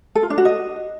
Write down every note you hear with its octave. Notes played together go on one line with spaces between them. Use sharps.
A4
F4
D4
F#4
D#5